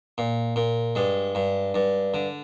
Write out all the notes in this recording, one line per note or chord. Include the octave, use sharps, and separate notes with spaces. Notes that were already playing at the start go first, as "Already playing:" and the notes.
A#2
A#2
G2 G#3
G2
G2
D3